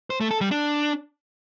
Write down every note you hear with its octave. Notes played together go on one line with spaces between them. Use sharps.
C5
A3
A4
G3
D4